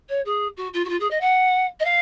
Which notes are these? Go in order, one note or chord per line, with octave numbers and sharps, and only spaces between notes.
C#5
G#4
F#4
F4
F#4
F4
G#4
D#5
F#5
D#5
F5